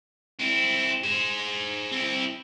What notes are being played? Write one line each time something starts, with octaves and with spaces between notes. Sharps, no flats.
C4 E4
G#4 C5
C4 E4